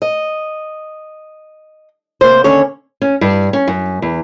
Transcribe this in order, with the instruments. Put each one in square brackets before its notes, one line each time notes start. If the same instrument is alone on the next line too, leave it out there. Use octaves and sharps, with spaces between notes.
[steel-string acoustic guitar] D#5
C3 A#3 C5
D#2 D3 C#4 C#5
[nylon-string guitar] C#4
G2
C#4
F#2
E2